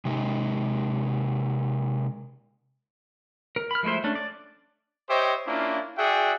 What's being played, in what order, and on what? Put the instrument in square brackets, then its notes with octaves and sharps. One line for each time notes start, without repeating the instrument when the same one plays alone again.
[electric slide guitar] C3 G#3 D#4
[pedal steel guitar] A#4
B5 F6
F3 G#3 A3 E4 C5
A3 C#4 D4
D5
[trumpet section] G4 C5 C#5 D#5 E5 G5
A#3 C#4 D4 E4 F4
F#4 G#4 D5 E5 F#5 G5